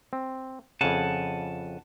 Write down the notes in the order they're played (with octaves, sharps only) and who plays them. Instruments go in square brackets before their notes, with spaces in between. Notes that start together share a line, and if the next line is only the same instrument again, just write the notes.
[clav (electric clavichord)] C4
[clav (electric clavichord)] F2 C#3 [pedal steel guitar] F#5 G#5 A5